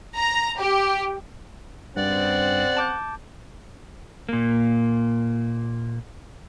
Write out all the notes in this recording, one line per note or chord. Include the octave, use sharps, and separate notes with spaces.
A#5
G4
G2 C#3 C4 D5 F#5
A5 D6 G6
A#2 A#3